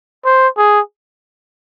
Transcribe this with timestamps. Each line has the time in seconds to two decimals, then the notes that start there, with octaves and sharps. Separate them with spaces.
0.25 C5
0.57 G#4